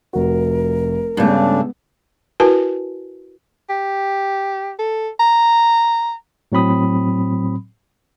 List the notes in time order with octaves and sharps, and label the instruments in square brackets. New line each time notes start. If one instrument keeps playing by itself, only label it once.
[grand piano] F1 F#4 [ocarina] A#4
[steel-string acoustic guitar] G2 A3 [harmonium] C#3 D4 [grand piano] G#3 B3
[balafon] E4 F#4 A#4 B4 G#5 A5
[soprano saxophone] G4
A4
A#5
[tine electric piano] A2 F#3 C4 B5 D#6